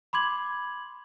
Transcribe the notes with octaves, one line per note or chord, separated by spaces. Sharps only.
B5 C6 D6 G#6 F#7